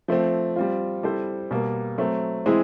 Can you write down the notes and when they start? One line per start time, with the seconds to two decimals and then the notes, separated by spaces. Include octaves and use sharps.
0.08 F3 A3 C4
0.56 G3 C4 F4
1.03 G3 C4 E4 A4 C5
1.51 B2 G3 A#3
1.98 F#3 A3 C4
2.46 E3 G#3 C4 E4 G#4